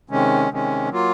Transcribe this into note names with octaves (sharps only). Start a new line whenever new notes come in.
C3 D#3 G#3 C#4
C3 D#3 G#3 C#4
F#3 A#3 F4